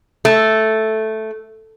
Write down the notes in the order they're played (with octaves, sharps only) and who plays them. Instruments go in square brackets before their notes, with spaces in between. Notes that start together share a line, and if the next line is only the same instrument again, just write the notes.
[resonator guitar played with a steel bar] A3